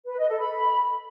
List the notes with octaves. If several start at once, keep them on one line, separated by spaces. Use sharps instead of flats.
B4
D#5
A4
B5